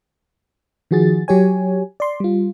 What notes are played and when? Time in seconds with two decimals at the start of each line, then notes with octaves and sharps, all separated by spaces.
0.91 D#3 F3 F#4 G#4 A6
1.28 F#3 G4 C#5 G#5
2.00 D5 C6
2.20 G3 F4